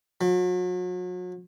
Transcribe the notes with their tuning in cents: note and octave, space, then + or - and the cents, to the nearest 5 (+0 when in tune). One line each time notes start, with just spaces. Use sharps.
F#3 -40